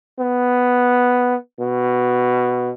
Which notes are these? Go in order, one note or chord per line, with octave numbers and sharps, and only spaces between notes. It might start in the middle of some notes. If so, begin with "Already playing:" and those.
B3
B2